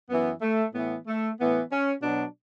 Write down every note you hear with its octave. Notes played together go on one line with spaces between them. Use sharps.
F#2 E3 B3
A3
A2 E3 B3
A3
A2 E3 B3
C#4
B2 F#3 D4